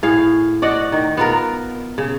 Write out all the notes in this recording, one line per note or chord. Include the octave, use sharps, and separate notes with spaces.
A2 G#4 F5
F#4 D5 D#5 F#5
D#3
B3 F4 A#4
C#3